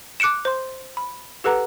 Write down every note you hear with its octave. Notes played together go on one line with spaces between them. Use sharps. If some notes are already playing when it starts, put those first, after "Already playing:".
D6 F#6 C#7 D7 E7
C5 C6
B5
G4 A4 B4 F#5 A#5